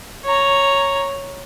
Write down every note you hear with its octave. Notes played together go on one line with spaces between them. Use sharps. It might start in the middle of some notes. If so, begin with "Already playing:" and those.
C#5 A#5